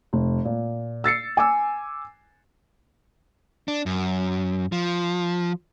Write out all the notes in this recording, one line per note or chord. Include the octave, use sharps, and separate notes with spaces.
F1
A#2
E6 A6 C7 C#7
G#5 D6 E6
D4
F#2
F3